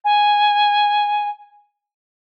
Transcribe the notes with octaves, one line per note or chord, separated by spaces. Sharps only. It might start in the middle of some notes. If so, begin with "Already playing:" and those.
G#5